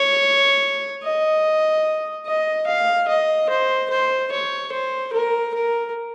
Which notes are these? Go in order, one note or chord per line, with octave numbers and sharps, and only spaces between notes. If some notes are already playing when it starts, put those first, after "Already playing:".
Already playing: C#5
D#5
D#5
F5
D#5
C5
C5
C#5
C5
A#4
A#4